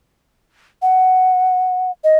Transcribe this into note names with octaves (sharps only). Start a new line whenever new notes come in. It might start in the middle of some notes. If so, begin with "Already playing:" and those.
F#5
D#5